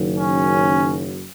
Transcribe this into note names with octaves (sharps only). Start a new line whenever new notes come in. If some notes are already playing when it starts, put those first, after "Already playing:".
Already playing: F#1 F#2 D#3
C#4